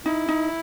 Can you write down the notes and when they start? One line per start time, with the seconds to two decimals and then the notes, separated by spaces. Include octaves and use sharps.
0.05 D#4 E4
0.28 D#4